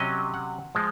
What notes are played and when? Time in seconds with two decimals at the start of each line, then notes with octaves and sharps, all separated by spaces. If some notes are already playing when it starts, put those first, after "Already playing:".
Already playing: C3 F#3 C#4 D#5
0.34 F#5
0.75 F3 G#3